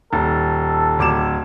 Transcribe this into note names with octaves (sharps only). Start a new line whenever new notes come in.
D#1 A4
D1 D6 E7